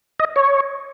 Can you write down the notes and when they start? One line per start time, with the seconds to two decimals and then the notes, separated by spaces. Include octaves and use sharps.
0.20 D#5
0.36 C#5